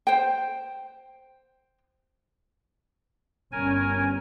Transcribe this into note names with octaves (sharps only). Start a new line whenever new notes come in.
C5 G5
G1 G2 C#4 A#4 G#5